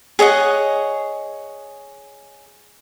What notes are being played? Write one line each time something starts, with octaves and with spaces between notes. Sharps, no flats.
G#4 C#5 D#5 F#5